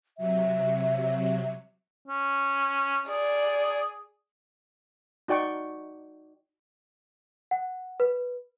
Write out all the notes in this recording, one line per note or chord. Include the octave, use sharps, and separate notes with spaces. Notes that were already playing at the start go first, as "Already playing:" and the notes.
C3 F#3 E5
C#4
G#4 D5
D#4 F#4 D5 G5 C#6
F#5
B4